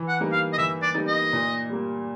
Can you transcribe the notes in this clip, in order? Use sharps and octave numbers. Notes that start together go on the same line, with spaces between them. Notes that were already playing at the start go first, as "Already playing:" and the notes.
Already playing: E3
F#5
G3 A#3 D#4
F5
D#5
E3 E5
D5
G3 A#3 D#4
D#5
A#2
G3 A#3